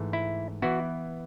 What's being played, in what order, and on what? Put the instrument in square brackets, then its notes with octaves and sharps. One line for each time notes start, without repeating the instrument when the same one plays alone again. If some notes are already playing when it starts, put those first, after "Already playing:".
Already playing: [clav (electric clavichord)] G#2 E3 A3
E4
E3 B3 E4 F#4